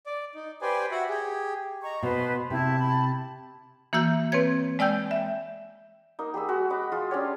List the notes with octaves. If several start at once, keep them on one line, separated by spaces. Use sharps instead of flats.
D5
D#4
G4 B4 C5 D5 G#5
F#4 E5 F#5
G4 G#4
D#5 A#5 C#6
B2 B4 C5
C3 E4 A5
B5
E3 A#3 F#4 E6 G6
C4 B4 C#5 G#6
G#3 D5 G5 E6 G6
E5
A#3 D#4
G4 G#4 B5 E6
G#3 F#4
D#5 B5 D6
G#3 F4
C#4 D4 G4 C#5